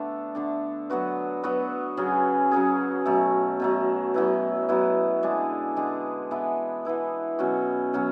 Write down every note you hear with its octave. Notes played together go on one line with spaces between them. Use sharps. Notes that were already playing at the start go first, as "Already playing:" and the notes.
Already playing: D3 A3 B3 D4 A4
D3 A3 D4
F#3 B3 F#4 B4
F#3 B3 F#4 B4
C#3 F#3 C#4 G#4
C#3 F#3 C#4 G#4
B2 F#3 A3
B2 F#3 A3
F#3 B3 E4 B4
F#3 B3 E4 B4
D3 G#3 D4 G#4
D3 G#3 D4 G#4
E3 B3 E4 B4
E3 B3 E4 B4
B2 F#3 C#4 F#4
B2 F#3 C#4 F#4